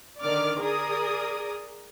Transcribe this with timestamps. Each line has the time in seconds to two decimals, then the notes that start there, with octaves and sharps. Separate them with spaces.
0.22 D3 D#3 D5 D6 F6
0.61 G#4 A#4 D5 D#6